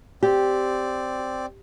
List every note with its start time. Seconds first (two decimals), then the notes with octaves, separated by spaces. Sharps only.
0.23 C4 G4 D5